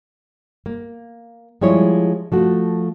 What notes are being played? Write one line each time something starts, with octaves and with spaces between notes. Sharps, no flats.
A#3
F3 G3 G#3 E4 C#5
F3 A3 F#4